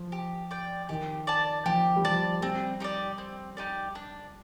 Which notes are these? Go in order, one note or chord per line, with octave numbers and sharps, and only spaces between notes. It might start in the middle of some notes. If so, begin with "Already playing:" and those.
Already playing: F3
G4
D5 G5
D#3 G4
D5 A5
F3 G4
G3
F3 D5 A5
G3 C4
D#4 G4 D5
C4
D#4 G4 D5
D4